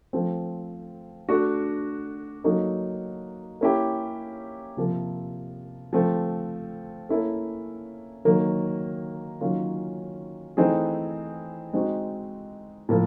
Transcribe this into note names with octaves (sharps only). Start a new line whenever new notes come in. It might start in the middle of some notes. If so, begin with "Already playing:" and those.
F3 A3 C4
A3 D4 F#4
F#3 A#3 D#4 F#4 A4
A#3 C#4 E4 G4
C3 F3 A#3
F3 A3 C4
A#3 C#4 E4 A4
D#3 F#3 A#3
D#3 F#3 A#3 C#4 F4
E3 A3 C4 D#4 G#4
G#3 C4 D#4 F#4
A2 F3 A#3